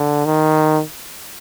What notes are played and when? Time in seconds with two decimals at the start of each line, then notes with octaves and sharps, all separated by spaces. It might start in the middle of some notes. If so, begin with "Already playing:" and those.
Already playing: D3
0.26 D#3